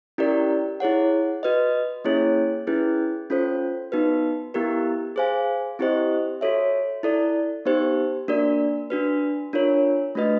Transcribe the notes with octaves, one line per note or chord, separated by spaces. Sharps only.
C#4 E4 G4 A#4 D5
E4 G#4 C#5 F#5
F#4 B4 D#5
A#3 C#4 E4 G#4 C#5
C#4 E4 G#4 B4
C#4 F4 A4 C5
B3 D#4 F#4 B4
B3 E4 G4 A#4
G#4 C5 F5 G#5
C4 E4 G4 C5 D#5
F#4 A4 C#5 E5
E4 A4 D5
B3 D#4 G4 C5
A#3 D4 F#4 A#4 D5
D4 F#4 B4
D4 F4 A#4 C#5
A3 D4 F#4 B4 D#5